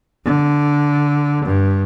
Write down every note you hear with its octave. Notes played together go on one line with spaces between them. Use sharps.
D3
G2